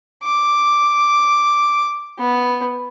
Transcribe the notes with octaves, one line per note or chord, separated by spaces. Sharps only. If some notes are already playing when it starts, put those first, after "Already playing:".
D6
B3